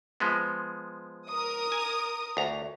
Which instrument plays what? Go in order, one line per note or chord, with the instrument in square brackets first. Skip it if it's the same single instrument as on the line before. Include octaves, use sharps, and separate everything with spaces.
[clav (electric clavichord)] F3 G#3 B3
[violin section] A#4 D#6
[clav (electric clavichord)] G#5
D2 A#5